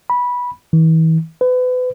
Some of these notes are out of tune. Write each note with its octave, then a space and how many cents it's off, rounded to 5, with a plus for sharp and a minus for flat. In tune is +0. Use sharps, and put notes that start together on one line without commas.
B5 -15
E3 -40
B4 +35